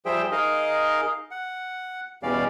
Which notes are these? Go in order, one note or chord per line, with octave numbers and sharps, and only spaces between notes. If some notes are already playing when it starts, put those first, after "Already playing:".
F3 G3 G#4 C5 E5 G5
D#4 G#4 A#4 D#5 F5
F#5
E2 B2 G3 C#4 D5 F5